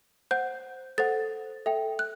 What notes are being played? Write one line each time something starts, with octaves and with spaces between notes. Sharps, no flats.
C5 F#5 G6
A4 C5 F#5 A6
A4 E5 G5
F#6